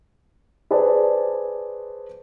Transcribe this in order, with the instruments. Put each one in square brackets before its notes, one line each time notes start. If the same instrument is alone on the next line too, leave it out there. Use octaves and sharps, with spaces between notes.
[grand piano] G#4 B4 C5 D5 A5